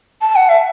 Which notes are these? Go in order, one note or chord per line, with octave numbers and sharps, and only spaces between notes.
A5
F#5
E5